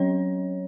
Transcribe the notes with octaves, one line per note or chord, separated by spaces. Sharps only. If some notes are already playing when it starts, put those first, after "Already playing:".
Already playing: F#3 C#4 C#5